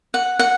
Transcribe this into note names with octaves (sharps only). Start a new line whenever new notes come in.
F#5
F#5